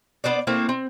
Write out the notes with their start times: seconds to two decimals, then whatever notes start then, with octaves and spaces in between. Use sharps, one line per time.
0.24 B3 D4 C5 D5
0.47 A3 A#3 C4 E4
0.69 C4